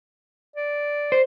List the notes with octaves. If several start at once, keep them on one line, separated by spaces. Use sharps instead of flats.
D5
C5